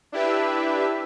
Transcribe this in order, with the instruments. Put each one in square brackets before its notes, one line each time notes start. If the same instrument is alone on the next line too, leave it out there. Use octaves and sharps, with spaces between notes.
[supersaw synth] D4 E4 G4 B4 E5